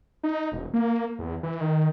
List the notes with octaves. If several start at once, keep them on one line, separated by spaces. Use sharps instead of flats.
D#4
E1
A#3
E2
E3
D#3